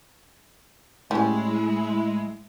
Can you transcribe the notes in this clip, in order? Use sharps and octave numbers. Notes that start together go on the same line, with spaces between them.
A2 G3 G#3 C#4 E4